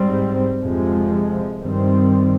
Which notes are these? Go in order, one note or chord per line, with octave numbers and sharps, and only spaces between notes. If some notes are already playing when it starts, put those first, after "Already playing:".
Already playing: G#2 G3 C4
F2 C3 F3 G#3
G2 D#3 G3 C4